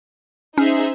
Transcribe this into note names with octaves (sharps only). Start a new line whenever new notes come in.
C#4 D#4 G#4 C5 E5